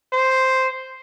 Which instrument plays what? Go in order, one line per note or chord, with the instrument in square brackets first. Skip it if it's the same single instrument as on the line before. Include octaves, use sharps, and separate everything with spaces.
[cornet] C5